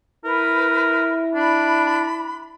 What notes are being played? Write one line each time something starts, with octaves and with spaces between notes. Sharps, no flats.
E4 A#4 B4
D4 B5